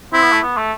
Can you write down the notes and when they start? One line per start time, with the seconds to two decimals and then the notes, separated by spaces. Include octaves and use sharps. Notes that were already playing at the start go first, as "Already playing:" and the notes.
0.13 C4 E4
0.22 B3
0.33 A3
0.43 B3
0.57 A3